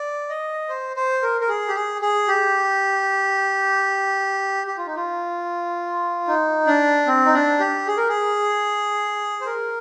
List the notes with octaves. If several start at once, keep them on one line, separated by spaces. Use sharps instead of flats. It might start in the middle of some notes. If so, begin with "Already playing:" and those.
Already playing: D5
D#5
C5
C5
A#4
A#4
G#4
G4
G#4
G#4
G4
G4
F4
D#4
F4
D#4
D4
C4
D#4
D4
G4
G#4
A#4
G#4
C5
A#4